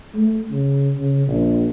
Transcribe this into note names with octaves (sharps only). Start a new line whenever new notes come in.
A3
C#3
C#3
A#1